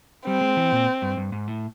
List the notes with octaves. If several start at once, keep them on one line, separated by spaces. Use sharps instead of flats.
G3 C4
G#3
E3
A#2
G2
G2
G#2
A2